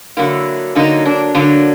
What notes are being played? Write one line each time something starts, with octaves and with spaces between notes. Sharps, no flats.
D3 F#3 A#3 E4
D3 F#3 A#3 D#4
D4
D3 F#3 A#3 D4